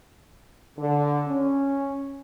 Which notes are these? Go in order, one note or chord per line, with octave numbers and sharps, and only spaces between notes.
D3
C#4